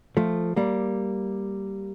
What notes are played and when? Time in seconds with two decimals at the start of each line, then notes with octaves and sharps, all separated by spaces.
0.17 F3 A3
0.56 G3 A#3